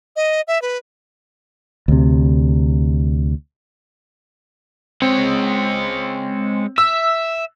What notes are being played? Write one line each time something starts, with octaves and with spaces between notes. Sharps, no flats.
D#5
E5
B4
D2 C3
G#3 C4 C#5
E5 E6